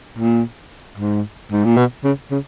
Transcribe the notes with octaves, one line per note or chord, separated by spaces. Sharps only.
A#2
G#2
G#2
A#2
B2
C#3
C#3